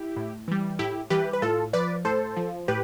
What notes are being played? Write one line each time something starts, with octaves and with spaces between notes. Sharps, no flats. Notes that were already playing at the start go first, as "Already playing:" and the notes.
Already playing: E4 G4
A2
E3 G3
A2 E4 G4
E3 G3 G4 B4
B4
A2 F4 A4
F3 B4 D5
A2 A4 C5
F3
A2 G4 B4